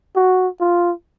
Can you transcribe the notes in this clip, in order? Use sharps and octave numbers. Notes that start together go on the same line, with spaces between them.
F#4
F4